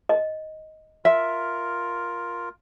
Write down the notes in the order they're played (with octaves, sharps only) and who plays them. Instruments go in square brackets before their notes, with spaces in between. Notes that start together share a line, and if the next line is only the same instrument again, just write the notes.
[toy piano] D#5
[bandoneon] F4 A#4 [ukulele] E5